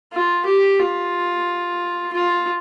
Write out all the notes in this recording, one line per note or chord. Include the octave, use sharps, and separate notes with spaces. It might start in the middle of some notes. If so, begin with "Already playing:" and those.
F4
G4
F4
F4